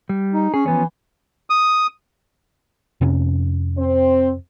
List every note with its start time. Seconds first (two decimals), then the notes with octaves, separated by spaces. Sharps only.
0.09 G3
0.33 D#4
0.54 C#4 G#4
0.66 E3 F3 B3 C#4
1.50 D#6
3.01 F2 C3 C#4
3.78 C4 C5